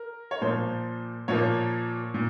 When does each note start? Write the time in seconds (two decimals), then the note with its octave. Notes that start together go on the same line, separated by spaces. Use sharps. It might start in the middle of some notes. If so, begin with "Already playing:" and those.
Already playing: A#4
0.31 C#5
0.41 A#2 F3 A#3 C5
1.28 A#2 F3 A#3 C#5
2.14 A#2